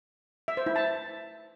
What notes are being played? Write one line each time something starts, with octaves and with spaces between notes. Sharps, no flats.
E5
C5
E4
A5